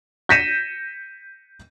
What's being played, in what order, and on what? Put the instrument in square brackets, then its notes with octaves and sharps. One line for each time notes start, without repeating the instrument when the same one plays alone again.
[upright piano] G6 A#6 B6 C#7 D#7 E7